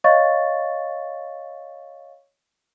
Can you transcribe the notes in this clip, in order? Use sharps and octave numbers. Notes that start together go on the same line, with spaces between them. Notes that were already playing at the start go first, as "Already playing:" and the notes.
C#5 D#5 F5 C#6 A6